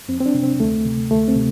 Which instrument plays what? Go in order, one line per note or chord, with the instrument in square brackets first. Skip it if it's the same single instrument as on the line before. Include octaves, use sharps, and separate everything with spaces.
[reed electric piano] F2 C4
C4
D4
C3
C4
D2 A3
C3
D2 A3
C4
C3